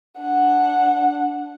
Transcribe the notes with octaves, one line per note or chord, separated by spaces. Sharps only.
D4 F#5